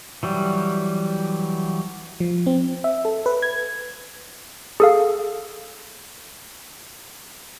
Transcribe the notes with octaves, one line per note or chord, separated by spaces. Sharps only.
E3 F#3 G3
F3
C4
E5
A4
B4
G#6
G#4 A4 F5